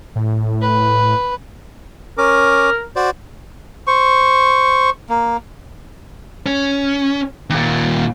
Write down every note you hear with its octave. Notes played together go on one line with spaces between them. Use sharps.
A2
B4
C#4 A#4 D6
F#4 C5 D5
C5 C#6
A#3
C#4
D#2 A#2